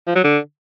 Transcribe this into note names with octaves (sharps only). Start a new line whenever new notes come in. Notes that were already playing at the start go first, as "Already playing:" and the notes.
F3
F#3
D3